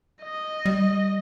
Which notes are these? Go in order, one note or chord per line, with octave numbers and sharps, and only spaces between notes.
D#5
G3